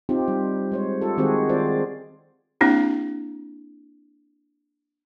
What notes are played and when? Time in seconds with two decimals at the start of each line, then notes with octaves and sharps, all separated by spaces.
0.09 C4 D#4 F4 G4
0.28 G3
0.72 G#3 C5 C#5
1.01 F4 G4 A4
1.17 D#3 G#3 C4 F#4 G#4 C5
1.49 C4 F4 C5 D5
2.61 A#3 C4 D4 E4 G4